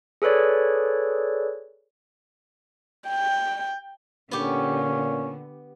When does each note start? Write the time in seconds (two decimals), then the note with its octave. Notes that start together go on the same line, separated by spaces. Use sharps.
0.22 G#4 A4 B4 C#5 D5
3.08 G5
4.31 A#2 D3 B3 C#4 G4